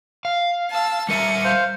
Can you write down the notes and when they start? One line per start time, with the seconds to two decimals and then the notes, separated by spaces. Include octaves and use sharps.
0.25 F5
0.70 A5 E6
1.09 G3 A#4 E5 C#7 D#7
1.44 C5 F5